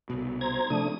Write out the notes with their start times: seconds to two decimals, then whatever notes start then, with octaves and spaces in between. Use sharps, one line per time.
0.10 C2 B2
0.41 C5 A#5 G#6
0.70 C3 F3 A3 D4 D#6